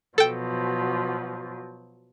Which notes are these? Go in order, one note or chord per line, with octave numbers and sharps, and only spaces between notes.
B2 F3 F#3 A4 G5